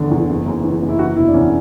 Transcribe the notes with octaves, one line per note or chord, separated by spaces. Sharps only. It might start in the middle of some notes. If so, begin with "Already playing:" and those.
Already playing: E1 E2 D3
E2
F#1
F#2
E3
F#1
E4
E3 F#4
E1 E4
D4
E1 C#4